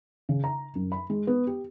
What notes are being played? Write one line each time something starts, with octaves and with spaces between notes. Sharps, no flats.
C#3
A#5
F#2
B5
G#3
B3
G4